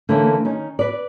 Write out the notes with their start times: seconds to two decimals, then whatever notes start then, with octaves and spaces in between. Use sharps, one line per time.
0.09 D3 E3 A3 A#3 C#4 E4
0.45 D#3 C#4 D#4
0.79 B4 D5